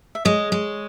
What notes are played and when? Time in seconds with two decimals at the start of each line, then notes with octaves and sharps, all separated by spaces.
0.15 E5
0.25 G#3 C#5 D#5
0.52 G#3